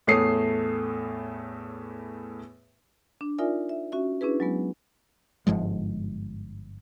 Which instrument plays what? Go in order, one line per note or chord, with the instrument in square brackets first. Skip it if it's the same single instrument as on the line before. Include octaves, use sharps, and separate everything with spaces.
[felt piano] E2 A2 A3 C#5 D#6 C7
[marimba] D4
D#4 F4 A#4 D5 E5 G#5
E5
C#4 F#4 E5
C#4 D4 E4 G#4 B4
F#3 G#3 B3
[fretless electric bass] G1 G#2 F3 G#3